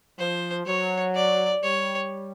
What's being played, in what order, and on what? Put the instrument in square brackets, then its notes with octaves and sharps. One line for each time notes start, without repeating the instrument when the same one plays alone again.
[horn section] F3 [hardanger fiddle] C5
[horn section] F#3 [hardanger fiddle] C#5
[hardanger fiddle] D5
[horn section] G3 [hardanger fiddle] C#5